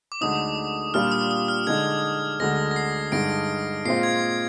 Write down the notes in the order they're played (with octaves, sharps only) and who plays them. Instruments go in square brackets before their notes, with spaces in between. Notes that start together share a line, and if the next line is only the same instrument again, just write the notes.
[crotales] D6
[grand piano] D2 D3 G#3 D#4 [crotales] D#6
[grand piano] A#2 G3 D4 F4 [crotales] F6
[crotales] D#6
D#6
F6
[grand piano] D3 G#3 D#4 [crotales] G#6
[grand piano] D2 D3 G#3 [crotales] A#6
[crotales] A#6
C7
[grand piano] G2 D3 G#3 D#4 [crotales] A#6 D7
[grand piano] A#2 G#3 C4 F4 [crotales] C7
[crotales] G#6